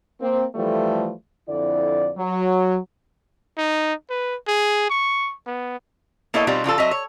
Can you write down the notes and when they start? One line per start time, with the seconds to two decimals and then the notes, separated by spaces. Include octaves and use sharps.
0.21 A#3 C4
0.55 E3 F3 G3 A3
1.49 F2 D3 E4 D5
2.17 F#3
3.58 D#4
4.10 B4
4.48 G#4
4.90 C#6
5.47 B3
6.34 A#3 B3 E4 A4 C#5 D#5
6.47 B2 G3 C4 D#4 F4
6.64 C#3 F3 F4 A4
6.78 F#3 C4 D#5 E5
6.91 C#5